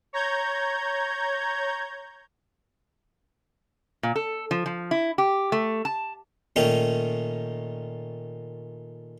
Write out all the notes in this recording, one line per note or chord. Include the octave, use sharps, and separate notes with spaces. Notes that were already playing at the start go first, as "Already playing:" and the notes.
C#5 A#5 G6 G#6
A#2
A4
F3
F3
E4
G4
A3
A5
A#2 D#3 A3 C#4 D#4